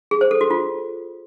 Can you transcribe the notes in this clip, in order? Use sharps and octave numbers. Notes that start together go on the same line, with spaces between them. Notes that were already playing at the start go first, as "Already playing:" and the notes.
G#4
C5
A4
F#4
F4